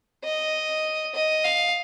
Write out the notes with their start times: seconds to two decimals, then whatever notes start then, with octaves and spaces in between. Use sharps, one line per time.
0.24 D#5
1.15 D#5
1.44 F5